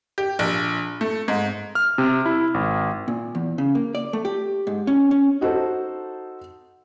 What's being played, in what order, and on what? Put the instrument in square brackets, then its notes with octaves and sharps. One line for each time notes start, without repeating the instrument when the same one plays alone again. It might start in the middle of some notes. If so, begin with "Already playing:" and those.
[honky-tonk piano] G4
A#1
A3
G#2
[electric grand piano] F6
C3
E4
G#1
[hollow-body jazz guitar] A#2
E2
C#3
A#3
D5
A3
G4
G#2
C#4
C#4
[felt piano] D#4 F#4 A4 C5